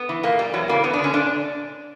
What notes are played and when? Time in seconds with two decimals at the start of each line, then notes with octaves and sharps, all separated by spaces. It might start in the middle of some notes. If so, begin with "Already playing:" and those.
Already playing: B3
0.09 E3
0.23 A#2 A#3
0.39 G3
0.54 E2 F#3
0.68 C#3 E3 A#3
0.84 G2 B3
0.94 D4
0.99 D3
1.04 C#4
1.13 A#2 D4